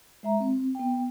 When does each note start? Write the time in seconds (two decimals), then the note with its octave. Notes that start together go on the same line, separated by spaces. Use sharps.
0.23 G#3 E5 A#5
0.40 C4
0.75 B3 G5